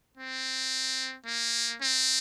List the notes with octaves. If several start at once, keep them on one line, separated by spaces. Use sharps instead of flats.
C4
A#3
C4